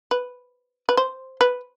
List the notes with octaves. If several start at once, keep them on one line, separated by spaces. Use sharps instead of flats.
B4
B4
C5
B4